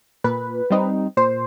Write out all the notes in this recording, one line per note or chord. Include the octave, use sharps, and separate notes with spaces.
A#2 B4
G3 C4 D#4
A#2 C5